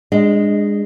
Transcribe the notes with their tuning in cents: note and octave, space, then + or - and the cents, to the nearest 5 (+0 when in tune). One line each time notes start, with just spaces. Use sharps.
G#3 -15 D4 +20 D#5 +0